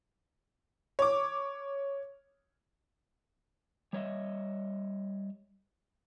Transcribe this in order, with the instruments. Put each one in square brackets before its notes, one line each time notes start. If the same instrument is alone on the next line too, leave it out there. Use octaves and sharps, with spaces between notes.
[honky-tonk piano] C#5 D6
[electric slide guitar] G3 C#5 D#5 E5